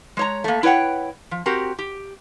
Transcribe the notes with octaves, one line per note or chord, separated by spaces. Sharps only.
G#3 C#5 A#5
A3 A#3
E4 B4 C#5 F#5 G5
F3
C4 F#4 G4 A#4
G4